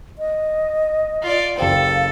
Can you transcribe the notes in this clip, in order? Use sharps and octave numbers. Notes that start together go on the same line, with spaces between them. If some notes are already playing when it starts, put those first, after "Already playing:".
D#5
F4 D5
F#1 G4 A4 C5 F5